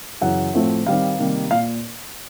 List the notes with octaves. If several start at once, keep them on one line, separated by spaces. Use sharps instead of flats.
F#2 C#3 E3 F#5
A2 F3 A3 C4 E4
D#3 G3 C4 D#4 F5
C3 D#3 G3 A#3
A#2 F5